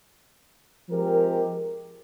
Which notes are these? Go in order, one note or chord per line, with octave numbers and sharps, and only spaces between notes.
F3 G#3 C4 G4 A#4